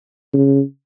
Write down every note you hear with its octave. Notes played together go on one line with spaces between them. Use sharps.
C#3